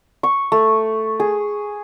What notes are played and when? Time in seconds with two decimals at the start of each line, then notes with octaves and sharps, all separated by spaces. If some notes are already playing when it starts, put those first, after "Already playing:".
0.23 C#6
0.52 A3
1.20 G#4